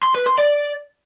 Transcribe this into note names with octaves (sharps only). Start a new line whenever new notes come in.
C6
B4
C6
D5